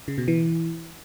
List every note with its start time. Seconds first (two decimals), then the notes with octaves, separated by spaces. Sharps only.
0.08 C#3
0.18 B2
0.28 E3